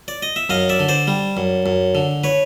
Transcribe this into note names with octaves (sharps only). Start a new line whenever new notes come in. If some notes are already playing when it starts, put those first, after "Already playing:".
D5
D#5
E5
F#2 D#5 F5
D5 E5
D3
C5 D5
G3
F#2
F#2
D3
B4 C#5